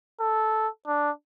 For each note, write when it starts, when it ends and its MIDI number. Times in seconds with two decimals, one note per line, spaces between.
0.20 0.68 69
0.87 1.10 62